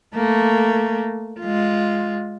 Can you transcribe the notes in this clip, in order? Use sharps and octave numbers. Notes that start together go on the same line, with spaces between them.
A3 A#3
G#3 F4